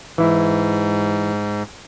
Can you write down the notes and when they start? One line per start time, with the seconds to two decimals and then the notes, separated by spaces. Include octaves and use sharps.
0.18 G#2 E3 E4